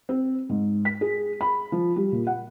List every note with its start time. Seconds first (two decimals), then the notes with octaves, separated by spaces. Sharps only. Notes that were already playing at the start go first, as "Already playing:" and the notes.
0.09 C4
0.49 G#2
0.85 B6
1.01 G#4
1.41 B5
1.72 F3
1.96 G3
2.12 A#2
2.27 F#5